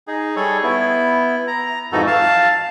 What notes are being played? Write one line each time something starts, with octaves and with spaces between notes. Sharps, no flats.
D#4 G#4
G3 G#4 A4 C#5
B3 E4
A#5
F2 G#2 E3 D#4 F#4 A4
F5 A5